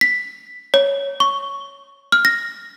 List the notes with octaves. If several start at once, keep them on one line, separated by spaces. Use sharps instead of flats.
B6
C#5
C#6
F6
A#6